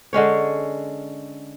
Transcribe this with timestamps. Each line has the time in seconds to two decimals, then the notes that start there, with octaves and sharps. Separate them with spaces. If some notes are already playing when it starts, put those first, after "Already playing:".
0.13 D3 G#3 C#4 C#5